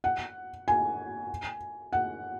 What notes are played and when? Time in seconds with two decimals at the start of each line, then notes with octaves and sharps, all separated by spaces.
0.04 F#5
0.68 G#5
1.93 F#5